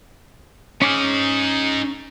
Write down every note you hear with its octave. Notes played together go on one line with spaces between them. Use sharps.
C#4 D#4 G#4 D6 F6